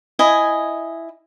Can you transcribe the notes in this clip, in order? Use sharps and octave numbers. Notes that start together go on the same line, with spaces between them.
E4 D#5 G#5